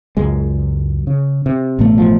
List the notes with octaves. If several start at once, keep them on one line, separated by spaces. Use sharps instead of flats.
C#2 F#2 G#3
C#3
C3
A1 B2 A3
F3